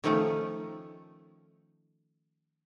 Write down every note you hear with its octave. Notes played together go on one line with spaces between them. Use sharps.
D#3 F3 A3 C#4 D#4